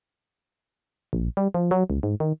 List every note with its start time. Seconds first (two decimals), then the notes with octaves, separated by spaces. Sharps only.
1.13 A#1
1.37 G3
1.54 F3
1.71 F#3
1.90 C#2
2.03 G#2
2.20 D#3